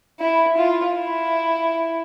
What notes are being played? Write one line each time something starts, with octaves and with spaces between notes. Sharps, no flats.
E4
F4
E4